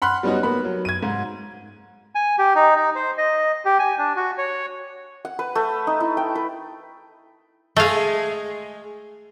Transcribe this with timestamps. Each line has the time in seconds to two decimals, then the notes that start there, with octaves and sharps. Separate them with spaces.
0.02 F#5 B5 C6 F6 F#6
0.23 G3 B3 C#4 D#4 F#4
0.43 A#3 B3 B5
0.65 F#3
0.85 G#6 D#7
1.03 G#2
2.15 G#5
2.38 G4
2.55 D#4
2.76 D#4
2.95 C5
3.18 D#5
3.65 G4
3.79 G#5
3.98 D4
4.16 F#4
4.38 C#5
5.25 F#5
5.39 B4
5.55 A3
5.87 D#4
6.00 E4
6.17 G5
6.35 B4
7.76 G#3 A3 G#4 F5